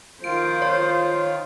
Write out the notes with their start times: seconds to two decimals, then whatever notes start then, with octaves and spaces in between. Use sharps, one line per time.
0.24 D#3 F4 C5 D7
0.62 C#5